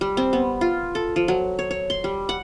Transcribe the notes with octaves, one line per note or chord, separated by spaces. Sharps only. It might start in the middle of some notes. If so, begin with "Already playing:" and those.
G3
C4
B3
F4
A4
F3
F#3
C#5
C#5
C6
G3
F#5